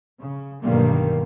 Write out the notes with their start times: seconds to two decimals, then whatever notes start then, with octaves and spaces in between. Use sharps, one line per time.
0.21 C#3
0.63 B1 G2 D3 D#3 G3 A#3